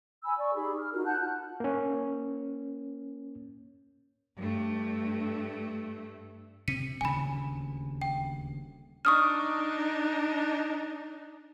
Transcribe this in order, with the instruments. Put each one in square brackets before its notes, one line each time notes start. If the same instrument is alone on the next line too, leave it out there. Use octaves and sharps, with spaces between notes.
[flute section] G#5 B5 E6
D5 C#6
D#4 G4 G#4 B5
F6
D#4 F4 F#4 A#4
F#5 A5 F#6 G6
[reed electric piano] A#3 C#4
[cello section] G2 A3
[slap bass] C3 C4 [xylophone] B6 C#7 D#7
[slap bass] D#1 D2 C#3 [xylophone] G#5 B5
[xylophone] G5
[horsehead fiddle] D4 D#4 [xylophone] C#6 D#6 F6